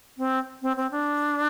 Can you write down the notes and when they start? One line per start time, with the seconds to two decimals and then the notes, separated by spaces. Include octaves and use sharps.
0.18 C4
0.62 C4
0.77 C4
0.91 D4